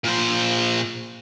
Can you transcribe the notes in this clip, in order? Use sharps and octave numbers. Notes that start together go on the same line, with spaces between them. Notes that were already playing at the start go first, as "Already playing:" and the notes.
A#2 C5